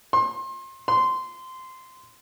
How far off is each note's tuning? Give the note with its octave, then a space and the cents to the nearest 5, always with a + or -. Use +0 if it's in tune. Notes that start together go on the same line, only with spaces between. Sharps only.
C6 +30
C6 -15